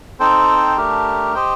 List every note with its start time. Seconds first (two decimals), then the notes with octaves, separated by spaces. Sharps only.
0.20 C4 D#4 A4 C5 G5
0.77 A3 D4 G4 A#4
1.35 G4 C5 D#5 G5